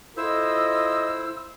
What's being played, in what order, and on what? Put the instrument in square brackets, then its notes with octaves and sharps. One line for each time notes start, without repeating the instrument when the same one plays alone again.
[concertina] E4 C5 [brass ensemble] F4 A4 D#5 [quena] E6